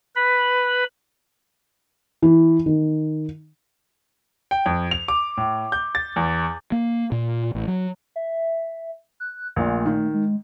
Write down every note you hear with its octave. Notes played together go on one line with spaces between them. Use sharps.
B4 B5
E3
D#3
G5
F2
F7
D6
A2
G6
A6
E2
A#3
A#2
A1
F#3
E5
F#6
A#1 A#2 A3
D#3
G#3